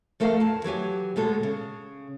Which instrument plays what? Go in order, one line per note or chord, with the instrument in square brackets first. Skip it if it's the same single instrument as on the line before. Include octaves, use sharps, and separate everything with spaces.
[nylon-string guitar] F3 A3 A4 A#4 F5
E2 A5
E3 F#3 G4 G#5
D2 B2 G#3 A4
C#3